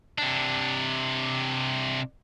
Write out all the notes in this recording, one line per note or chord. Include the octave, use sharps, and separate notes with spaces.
C3 D4